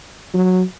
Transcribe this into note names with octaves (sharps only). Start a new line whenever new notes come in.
F#3